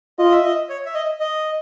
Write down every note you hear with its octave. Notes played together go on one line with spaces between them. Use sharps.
F4 D#5
E5
D#5
C#5
E5
D#5
D#5